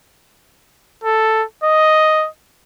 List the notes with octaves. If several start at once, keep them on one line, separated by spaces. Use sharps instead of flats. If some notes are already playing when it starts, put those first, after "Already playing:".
A4
D#5